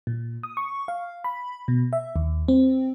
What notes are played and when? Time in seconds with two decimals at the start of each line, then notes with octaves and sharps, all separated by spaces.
0.07 A#2
0.43 D#6
0.57 C#6
0.88 F5
1.24 B5
1.68 B2
1.93 E5
2.16 D#2
2.48 C4